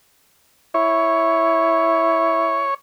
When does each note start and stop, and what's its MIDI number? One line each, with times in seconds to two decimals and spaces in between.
0.74 2.66 64
0.74 2.74 73